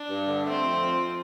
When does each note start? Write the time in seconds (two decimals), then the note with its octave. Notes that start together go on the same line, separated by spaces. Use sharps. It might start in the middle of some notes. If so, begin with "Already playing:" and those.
Already playing: D4
0.09 G2
0.27 D3
0.45 A3 C4
0.63 F2
0.81 F3